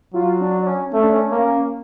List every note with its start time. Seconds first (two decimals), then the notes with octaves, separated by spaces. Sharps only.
0.14 F#3 F4
0.41 D4
0.62 D4
0.67 C#4
0.92 A3 C#4
1.03 D4
1.13 C#4
1.32 A#3